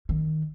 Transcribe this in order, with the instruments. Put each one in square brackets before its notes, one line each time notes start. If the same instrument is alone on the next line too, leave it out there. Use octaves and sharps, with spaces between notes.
[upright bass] D#3